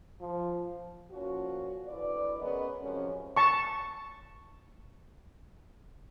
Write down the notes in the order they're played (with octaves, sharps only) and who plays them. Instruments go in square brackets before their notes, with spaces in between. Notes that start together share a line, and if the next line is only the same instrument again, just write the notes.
[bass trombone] F3
[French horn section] A#2 F3 C#4 F4 F#4
D2 E3 B4 D5
G#3 B3 C#4 A#4 B4 D#5
F#2 C3 F3 G#3 C#4
[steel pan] A5 C#6